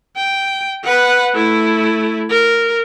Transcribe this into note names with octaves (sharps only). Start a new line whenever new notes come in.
G5
B4 F#5
A3 E4
A#4